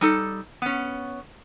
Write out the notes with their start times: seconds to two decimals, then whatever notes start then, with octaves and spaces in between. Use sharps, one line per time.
0.01 G3 D#4 A4
0.62 B3 C#4